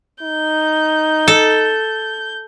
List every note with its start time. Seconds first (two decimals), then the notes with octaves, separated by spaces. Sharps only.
0.23 D#4 G6
1.28 A4